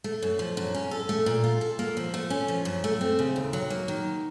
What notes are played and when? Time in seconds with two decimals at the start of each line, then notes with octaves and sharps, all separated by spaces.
0.04 A3
0.22 F#2
0.39 F3
0.57 F#2
0.74 C#4
0.91 A4
1.09 A3
1.26 A#2
1.44 F4
1.61 A4
1.79 A#3
1.97 F3
2.14 A3
2.30 C#4
2.48 F3
2.65 F#2
2.84 A3
3.01 C4
3.19 C#3
3.36 D#2
3.53 F#3
3.70 A#3
3.88 D#3